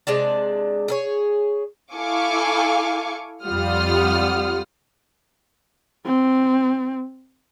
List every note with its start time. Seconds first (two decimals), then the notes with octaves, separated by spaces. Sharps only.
0.07 C3 G#3 D4 D5
0.88 G#4 A4 C#5
1.92 E4 A4 F5 G#5 C#6 D6
3.44 F2 G3 F4 F#5 D#6 F6
6.06 C4